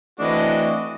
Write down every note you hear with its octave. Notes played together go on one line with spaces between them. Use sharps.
E3 A3 C4 D4 F#4 D#5